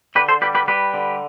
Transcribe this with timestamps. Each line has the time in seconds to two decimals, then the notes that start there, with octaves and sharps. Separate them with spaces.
0.15 D3 G4 B4
0.28 A4 C5
0.41 G3 G4 B4
0.55 G4 B4
0.67 G3 G4 B4
0.94 D3